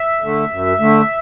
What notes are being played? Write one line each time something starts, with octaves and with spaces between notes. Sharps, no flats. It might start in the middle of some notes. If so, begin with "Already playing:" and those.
Already playing: E5
D3 A3
F#2
D3 A3